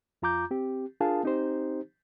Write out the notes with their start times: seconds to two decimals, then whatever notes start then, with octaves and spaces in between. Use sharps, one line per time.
0.22 F2 F4 A#5 D6 G6
0.51 C4 G4
1.00 D4 F4 G#4 A#4 F5 A5
1.24 C4 D#4 G4 C5